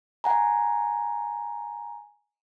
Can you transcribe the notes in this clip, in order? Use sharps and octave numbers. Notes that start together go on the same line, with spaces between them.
F#5 G#5 A#5